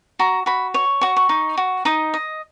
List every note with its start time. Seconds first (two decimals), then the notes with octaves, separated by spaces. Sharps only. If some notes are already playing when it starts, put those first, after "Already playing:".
0.19 F#4 A#5
0.46 F#4 B5
0.74 C#5 C#6
1.01 F#4 C#6
1.16 C#6
1.29 D#4
1.57 F#4
1.85 D#4 D#6
2.14 D#5